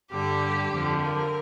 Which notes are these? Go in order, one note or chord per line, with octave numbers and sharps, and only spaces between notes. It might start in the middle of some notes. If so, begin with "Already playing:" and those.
G2 D3 G3 G4
F2 D3 F3
A#4